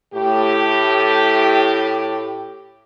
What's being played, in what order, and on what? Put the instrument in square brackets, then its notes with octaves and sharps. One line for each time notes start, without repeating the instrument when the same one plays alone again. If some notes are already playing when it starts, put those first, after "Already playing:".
[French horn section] A2 G4